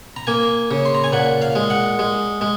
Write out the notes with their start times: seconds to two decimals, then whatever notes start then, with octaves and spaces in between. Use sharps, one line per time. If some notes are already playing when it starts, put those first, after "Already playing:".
0.16 A#5
0.27 A#3 G#5
0.71 C#3
0.86 C6
0.95 A#5
1.04 G#5
1.13 A#2 F#5
1.42 F5
1.55 G#3
1.70 F#5
1.99 G#3
2.41 G#3